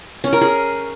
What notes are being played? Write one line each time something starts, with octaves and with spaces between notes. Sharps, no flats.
C#4
A#4
G#4